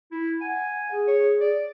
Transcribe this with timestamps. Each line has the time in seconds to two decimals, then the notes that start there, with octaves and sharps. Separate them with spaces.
0.12 E4
0.41 F#5 G#5
0.91 G#4
1.07 C#5
1.41 D5